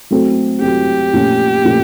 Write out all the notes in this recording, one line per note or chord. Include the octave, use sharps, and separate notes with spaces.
F#3 A3 C4
F#3 A3 C4 G4
A#2 F3 A3 C#4
A#2 F3 A3 C#4